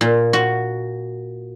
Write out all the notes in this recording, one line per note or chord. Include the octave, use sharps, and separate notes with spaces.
A#2
F#4